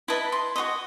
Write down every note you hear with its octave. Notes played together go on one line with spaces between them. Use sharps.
E4 B4 D#5 A5
C6
F#4 C5 D#5 D#6